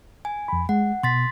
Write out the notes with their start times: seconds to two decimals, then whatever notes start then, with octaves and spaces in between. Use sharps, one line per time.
0.25 G#5
0.48 F2 B5
0.69 G#3 F#5
1.03 B2 C6 A6 B6